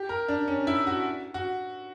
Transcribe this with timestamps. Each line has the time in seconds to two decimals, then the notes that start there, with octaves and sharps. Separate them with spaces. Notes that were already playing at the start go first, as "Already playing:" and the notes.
Already playing: G4
0.09 A#4
0.28 D4
0.48 C#4
0.67 E4
0.87 F#4
1.34 F#4